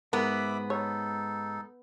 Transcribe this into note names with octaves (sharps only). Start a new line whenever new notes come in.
G#2 B3 A#4 E5 B5 D6
D#4 A4 C#5